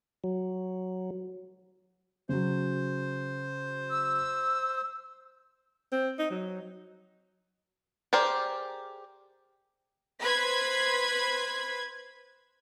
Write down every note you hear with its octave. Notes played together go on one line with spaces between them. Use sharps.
F#3
C#3 F#3 C5
E6
C4
D#4
F#3
G4 G#4 A#4 C5 D5
B4 C5 B5 G#6 B6